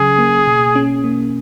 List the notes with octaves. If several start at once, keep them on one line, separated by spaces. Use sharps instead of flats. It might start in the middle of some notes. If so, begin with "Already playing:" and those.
Already playing: C#3 F#3 C#4 G#4
A#3
B2
C#4
A#3